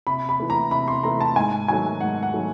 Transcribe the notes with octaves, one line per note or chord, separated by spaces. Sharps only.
C3 B5
B5
E3 A3
A#5
C3 B5
C6
E3 A3 A#5
A5
G#2 G#5
D#3 F#3 A3 G#5
G#2 F#5
F#5
D#3 F#3 A3